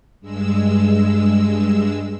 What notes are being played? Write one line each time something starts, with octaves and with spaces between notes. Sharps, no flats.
G2 G#3 E6